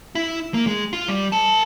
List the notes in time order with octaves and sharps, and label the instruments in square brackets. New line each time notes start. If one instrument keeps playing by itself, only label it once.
[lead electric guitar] E4
A#3
G#3
F4
G3
A#4 A5